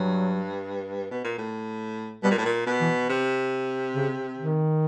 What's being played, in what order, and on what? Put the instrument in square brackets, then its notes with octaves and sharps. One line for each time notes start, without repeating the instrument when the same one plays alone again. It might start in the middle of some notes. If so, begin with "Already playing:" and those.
Already playing: [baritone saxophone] G2 [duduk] F#3
[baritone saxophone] B2
A#2
A2
[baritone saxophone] B2 [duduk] G3
[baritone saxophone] A#2
A2
A#2
B2
[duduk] E3
[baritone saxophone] C3
[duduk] C#3
D#3